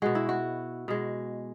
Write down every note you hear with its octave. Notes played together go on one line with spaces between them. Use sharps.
B2 G#3 F#4
E4
F#4
B2 G#3